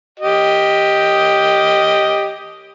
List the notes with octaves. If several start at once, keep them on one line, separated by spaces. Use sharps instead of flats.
G4 D#5